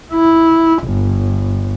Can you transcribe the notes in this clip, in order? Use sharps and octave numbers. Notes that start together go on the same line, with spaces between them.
E4
G1